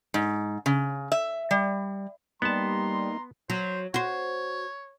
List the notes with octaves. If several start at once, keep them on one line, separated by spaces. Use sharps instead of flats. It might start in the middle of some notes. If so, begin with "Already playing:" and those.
G#2
C#3
E5
G3
G3 A#3 B3 D#4 A5 A#5 C6
F#3 C5
F#4 C5 C#5